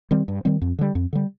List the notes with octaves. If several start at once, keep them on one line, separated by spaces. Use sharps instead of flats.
D#3 G3 C4
G2
D#3 G3 C4
F2
D3 G3
F2
D3 G3